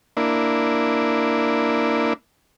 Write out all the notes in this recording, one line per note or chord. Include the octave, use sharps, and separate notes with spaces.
A#3 D4 E4